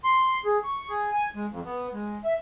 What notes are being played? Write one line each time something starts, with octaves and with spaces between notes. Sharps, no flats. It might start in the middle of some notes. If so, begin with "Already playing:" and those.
C6
G#4
C#6
G#4
G#5
G#3
F2
B3
G#3
E5